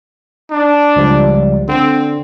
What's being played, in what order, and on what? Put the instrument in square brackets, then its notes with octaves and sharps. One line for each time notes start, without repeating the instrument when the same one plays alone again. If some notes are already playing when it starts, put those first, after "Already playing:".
[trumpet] D4
[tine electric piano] C#2 F3 G3
[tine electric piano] D3 [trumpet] C4